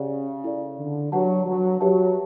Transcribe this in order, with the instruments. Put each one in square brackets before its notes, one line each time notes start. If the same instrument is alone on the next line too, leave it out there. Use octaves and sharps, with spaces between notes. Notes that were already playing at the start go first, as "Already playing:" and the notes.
Already playing: [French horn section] C#3 [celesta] G4 D5 F#5
[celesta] E4 A4 D5
[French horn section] D3
[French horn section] F#3 [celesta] D4 G4 B4 F#5 A5
[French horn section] F#3
[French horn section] F#3 [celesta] G4 B4 E5 A5